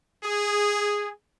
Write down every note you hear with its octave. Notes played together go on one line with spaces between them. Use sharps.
G#4